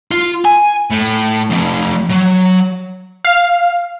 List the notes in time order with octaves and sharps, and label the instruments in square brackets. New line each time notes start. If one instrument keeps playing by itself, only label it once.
[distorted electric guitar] F4
G#5
A2
F3 A3
F#3
[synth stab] F5